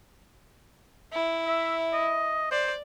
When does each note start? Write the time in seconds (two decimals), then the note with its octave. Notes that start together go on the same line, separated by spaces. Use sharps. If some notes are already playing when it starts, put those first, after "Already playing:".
1.13 E4
1.47 E5
1.93 D#5
2.51 C5 D5